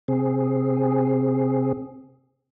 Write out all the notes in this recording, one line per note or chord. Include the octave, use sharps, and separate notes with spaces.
C3 C4 G#4